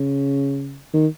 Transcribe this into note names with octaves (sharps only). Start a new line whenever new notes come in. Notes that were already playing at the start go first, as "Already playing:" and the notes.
Already playing: C#3
D#3